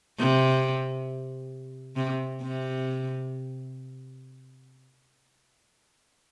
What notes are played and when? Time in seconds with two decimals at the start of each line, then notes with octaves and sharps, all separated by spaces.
0.19 C3
1.96 C3
2.42 C3